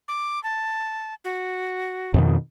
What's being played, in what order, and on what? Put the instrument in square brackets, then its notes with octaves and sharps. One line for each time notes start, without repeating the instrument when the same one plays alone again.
[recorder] D6
A5
F#4
[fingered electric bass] F2 B2 D#3